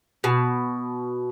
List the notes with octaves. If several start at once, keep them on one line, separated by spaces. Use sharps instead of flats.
B2